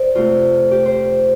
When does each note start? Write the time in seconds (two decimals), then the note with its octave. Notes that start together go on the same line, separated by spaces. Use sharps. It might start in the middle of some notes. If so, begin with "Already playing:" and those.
Already playing: C5 D5
0.15 F2 C3 A3 F4
0.71 G4
0.85 C5